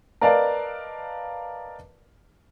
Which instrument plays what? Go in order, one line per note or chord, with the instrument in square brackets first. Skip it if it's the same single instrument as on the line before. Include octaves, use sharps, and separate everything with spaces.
[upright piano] A#4 B4 D5 D#5 F5 A5